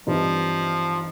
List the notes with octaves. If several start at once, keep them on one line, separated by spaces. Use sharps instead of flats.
G2 E3 F3 G3 C4 D#4